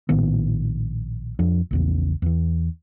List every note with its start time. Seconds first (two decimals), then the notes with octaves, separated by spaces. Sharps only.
0.09 A#1 A2 D#3 B3
1.39 F2 F3 D4
1.71 A#1 E2 C#3
2.22 E2 E3